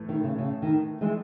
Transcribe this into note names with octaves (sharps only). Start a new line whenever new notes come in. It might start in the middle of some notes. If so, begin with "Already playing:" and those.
Already playing: A2 E3 A3
D#3
C#3
C#3
D#3
E3 G#3